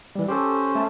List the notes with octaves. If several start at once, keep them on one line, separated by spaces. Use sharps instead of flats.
E3 G3
C#4 G4 A4 C5
A3 A5